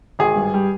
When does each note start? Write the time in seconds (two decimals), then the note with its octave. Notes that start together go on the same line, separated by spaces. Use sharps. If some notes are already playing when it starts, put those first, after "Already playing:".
0.19 G#1 G#4
0.36 G2
0.54 G3